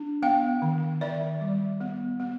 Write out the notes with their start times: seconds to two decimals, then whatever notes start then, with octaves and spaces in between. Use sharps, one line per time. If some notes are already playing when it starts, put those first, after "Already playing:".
Already playing: D4
0.22 B3 F5 G5
0.62 D#3
1.01 D#3 D5 E5
1.41 G3
1.80 B3
2.20 B3